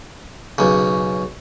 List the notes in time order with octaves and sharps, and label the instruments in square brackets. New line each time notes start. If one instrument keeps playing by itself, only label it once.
[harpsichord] B1 C#3